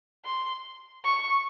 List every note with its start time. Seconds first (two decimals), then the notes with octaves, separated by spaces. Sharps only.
0.26 C6
1.05 C#6